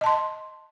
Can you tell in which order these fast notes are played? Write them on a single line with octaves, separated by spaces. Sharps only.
D#5 A5 C6